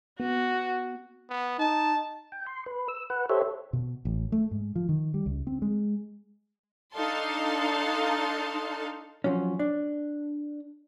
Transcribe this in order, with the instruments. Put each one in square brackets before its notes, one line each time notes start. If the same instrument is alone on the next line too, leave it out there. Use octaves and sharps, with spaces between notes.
[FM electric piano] B3 [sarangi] F#4
[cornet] B3
[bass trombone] D#4 [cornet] A5
[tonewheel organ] G5
C6
B4
E6
B4 F#5
G4 A4 C5 C#5 E5
[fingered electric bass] B2
A1
A3
G#2
F3
D#3
G3
C#2
C4
G#3
[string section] D4 D#4 A4 F5 A5 C6
[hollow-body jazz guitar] F3 F#3 C#4
D4